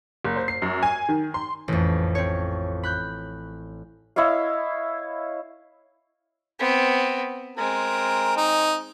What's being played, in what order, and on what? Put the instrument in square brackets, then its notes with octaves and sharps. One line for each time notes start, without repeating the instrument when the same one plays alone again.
[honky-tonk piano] F#1
C5
C7
F#2
G#5
D#3
C6
[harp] A1 F2
C4 C#5
B5 F#6 G6
[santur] E4 C#5 D#5 F5
[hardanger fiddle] B3 C4
[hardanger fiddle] G#3 C4 [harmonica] A#4
[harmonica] D#4